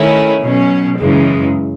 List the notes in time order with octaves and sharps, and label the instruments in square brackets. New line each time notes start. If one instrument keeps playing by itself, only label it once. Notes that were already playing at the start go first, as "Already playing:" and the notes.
Already playing: [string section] D#3 A3 C#4 E4
B2 F#3 C#4
F#2 C#3 E3 G#3